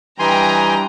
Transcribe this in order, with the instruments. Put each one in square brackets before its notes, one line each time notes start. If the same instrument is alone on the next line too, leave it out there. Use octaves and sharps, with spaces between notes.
[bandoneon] E3 G#5 C6 [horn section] G3 D4 D#5 [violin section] G5 A#5